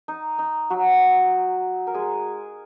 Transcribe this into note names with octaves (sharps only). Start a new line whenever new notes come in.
D#4
D#4
F#3 F#4
A#4
G#3 G#4